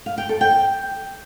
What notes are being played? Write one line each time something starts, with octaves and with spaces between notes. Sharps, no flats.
F5
G5
A4
G5